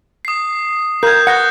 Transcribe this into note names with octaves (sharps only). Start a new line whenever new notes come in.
D#6 C7
A#4 G6 G#6
F#5 F#6 A#6 C#7